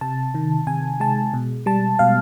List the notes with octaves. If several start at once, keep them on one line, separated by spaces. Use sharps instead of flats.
C3 A5
D#3
C3 G#5
G#3 A5
B2
G3 A5
B2 F5